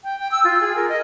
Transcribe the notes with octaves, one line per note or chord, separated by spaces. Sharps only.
G5
G5
E6
F4
G#4
A#4
D#5